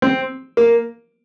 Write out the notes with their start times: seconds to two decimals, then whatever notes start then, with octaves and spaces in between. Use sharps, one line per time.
0.02 C4
0.57 A#3